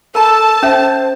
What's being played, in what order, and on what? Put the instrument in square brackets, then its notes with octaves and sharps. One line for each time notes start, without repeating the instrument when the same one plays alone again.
[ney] A4 [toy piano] A#4 A#5 [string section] A5
[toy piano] C#4 A4 E5 [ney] C5